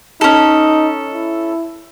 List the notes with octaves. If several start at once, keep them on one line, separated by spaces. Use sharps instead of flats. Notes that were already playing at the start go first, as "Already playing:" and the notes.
C#4 D#4 A4
E4